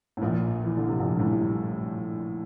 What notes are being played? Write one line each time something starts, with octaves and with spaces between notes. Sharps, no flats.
A2
A#1 A#2
E3
D3
C3
A#1 A#2
G2
A2
C3